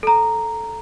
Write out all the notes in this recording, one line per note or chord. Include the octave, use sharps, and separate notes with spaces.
A4 A#5